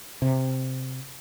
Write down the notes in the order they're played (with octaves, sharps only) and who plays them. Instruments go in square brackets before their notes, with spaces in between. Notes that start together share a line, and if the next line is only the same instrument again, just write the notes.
[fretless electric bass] C3